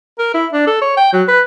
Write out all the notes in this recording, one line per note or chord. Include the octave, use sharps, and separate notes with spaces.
A#4
E4
D4
A4
C#5
G5
F#3
B4